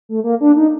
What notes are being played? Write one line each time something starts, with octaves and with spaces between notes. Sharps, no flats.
A3
A#3
D4
D#4